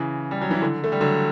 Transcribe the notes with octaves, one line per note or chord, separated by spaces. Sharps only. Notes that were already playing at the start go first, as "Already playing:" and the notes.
Already playing: C#3 E3
G3
F#3
E3
D3
A3
G3
D3 F#3